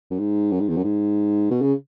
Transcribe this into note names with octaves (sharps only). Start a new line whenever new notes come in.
F#2
G#2
F#2
G#2
E2
F#2
G#2
B2
C#3